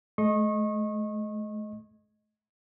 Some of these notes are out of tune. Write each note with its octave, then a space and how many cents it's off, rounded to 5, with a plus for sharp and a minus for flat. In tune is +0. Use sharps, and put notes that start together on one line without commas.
A3 -40 D#5 +0 C#6 -30